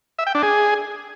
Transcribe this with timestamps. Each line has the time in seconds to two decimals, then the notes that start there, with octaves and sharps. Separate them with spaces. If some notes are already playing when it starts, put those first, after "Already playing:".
0.19 E5
0.27 G5
0.35 D4
0.43 G#4